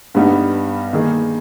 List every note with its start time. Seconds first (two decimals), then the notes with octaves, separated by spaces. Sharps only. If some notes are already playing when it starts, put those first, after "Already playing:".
0.15 G2 G3 B3 D#4
0.93 D#3 A#3 D#4 G#4